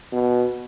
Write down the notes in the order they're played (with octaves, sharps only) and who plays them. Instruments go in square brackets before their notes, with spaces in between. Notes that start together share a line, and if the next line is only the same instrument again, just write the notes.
[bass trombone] B2